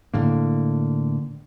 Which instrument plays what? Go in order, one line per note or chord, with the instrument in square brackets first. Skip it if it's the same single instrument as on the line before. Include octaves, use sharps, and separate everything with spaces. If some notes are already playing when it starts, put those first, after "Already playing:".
[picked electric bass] A2 D3 A#3